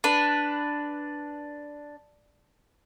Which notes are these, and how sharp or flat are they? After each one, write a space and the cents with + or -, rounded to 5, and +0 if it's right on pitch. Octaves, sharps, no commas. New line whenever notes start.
D4 +0 B4 +0